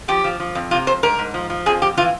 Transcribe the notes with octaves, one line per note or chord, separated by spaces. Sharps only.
F3 G4
F3
F3
F2
C3 F4
F2 C5
G#2 A#4
G#2
F3
F3
F2 G#4
F2 G4
E3 F4